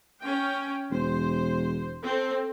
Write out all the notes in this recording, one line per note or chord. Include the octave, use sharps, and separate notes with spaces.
C#4 G5
E1 C5
C4 A4